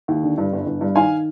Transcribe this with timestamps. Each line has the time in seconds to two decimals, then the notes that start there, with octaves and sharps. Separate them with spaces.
0.08 D#2
0.23 D3
0.38 G2
0.53 G1
0.66 G1
0.81 G2
0.95 D#3 F5 G#5